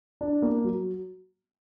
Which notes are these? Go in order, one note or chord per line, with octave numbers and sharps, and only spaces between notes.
D4
A#3
F#3